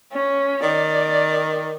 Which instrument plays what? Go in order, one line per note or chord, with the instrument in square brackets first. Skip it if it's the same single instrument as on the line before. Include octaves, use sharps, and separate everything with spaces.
[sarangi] C#4
[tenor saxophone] D#3 [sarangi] D5